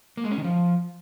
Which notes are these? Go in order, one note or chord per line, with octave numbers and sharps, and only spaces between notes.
A#3
G#3
C#4
D#3
F3